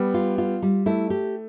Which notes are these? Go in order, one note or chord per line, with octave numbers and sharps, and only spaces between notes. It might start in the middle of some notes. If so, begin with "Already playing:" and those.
Already playing: G3 B3
F4
F4
G3
A3 E4
G4